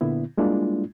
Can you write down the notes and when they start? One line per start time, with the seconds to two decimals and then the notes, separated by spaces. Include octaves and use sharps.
0.01 A#2 D3 B3 E4
0.38 G3 G#3 A#3 D4 E4 F4